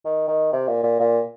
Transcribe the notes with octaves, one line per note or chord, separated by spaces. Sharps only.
D#3
D#3
C3
A#2
A#2
A#2